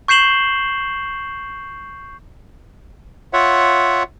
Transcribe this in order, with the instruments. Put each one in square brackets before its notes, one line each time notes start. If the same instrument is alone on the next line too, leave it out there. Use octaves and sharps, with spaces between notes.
[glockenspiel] C#6 G6 C7 E7 F#7 G7
[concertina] F4 C#5 E5 F#5